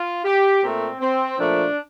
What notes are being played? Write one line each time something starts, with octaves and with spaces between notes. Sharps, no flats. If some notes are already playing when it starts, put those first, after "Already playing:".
Already playing: F4
G4
A#2 A3 C4
C4
A#2 F3 A3 D4